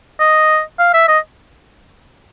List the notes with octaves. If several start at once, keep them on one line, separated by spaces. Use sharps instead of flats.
D#5
F5
E5
D#5